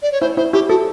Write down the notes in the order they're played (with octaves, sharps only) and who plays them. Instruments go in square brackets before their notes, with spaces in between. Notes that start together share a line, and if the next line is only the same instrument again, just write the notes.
[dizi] D5
C#5
[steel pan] E4 [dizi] C5
[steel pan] E4 [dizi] C5
[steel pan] E4 [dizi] G4
[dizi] F#4 [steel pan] A4